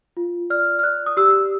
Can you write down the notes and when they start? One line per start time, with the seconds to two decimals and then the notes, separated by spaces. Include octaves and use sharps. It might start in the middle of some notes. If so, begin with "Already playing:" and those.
0.17 F4
0.50 D5 F6
0.79 F6
0.83 D5 F#6
1.06 D#6
1.17 G4 E6